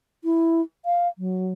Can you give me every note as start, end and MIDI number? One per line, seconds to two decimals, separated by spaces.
0.24 0.62 64
0.85 1.08 77
1.18 1.53 54